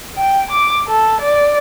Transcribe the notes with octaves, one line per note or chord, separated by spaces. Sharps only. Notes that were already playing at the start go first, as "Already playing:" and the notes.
G5
D6
A4
D5